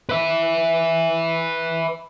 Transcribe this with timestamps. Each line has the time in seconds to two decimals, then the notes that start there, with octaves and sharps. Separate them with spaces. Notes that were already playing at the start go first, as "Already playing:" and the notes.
0.09 B4 E5